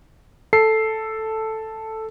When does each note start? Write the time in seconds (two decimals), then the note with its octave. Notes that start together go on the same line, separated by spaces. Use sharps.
0.53 A4 C7